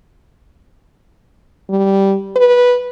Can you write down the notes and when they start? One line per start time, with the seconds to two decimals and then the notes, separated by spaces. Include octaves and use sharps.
1.70 G3
2.36 B4